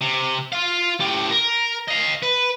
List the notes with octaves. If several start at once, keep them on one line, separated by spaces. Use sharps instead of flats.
C3
F4 F5
A2 G4
A#4
D#5 F5
B4